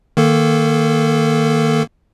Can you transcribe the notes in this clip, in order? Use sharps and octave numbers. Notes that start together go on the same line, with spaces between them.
D#3 A#3 A4